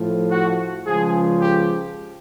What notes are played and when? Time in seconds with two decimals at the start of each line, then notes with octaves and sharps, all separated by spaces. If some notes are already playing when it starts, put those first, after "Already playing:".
Already playing: A2 F3
0.30 F#4
0.86 C#2 C#3 F3 G#4
1.41 G4